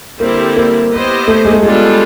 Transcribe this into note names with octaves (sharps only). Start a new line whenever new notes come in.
D3 G3 A#3 C4 E4 G4
A#3
B3 E4 G4 C5 D#5
A3
G#3
A3
G3 G#3 B3 D4 F4 A4